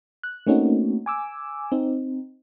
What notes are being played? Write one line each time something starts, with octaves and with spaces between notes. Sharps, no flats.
F#6
A3 A#3 C4 C#4 D#4 F#4
G#5 D6 E6
C4 D#4